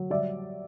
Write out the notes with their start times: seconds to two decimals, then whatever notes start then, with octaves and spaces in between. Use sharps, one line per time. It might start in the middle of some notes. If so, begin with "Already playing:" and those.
Already playing: F#3
0.10 G3 D5 E5